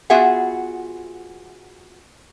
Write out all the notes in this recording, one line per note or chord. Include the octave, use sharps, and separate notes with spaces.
B3 F4 F#4 G#4 E5 F#5